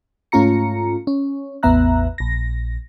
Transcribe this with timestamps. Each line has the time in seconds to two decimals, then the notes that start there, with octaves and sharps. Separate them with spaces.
0.32 G#2 A3 C#4 F4 A#5 C#7
1.07 C#4
1.63 A1 E2 B3 E5 A#5 F#6
2.18 A#1 A#6